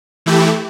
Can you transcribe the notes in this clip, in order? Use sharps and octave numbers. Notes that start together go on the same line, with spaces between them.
E3 A3 E4 G4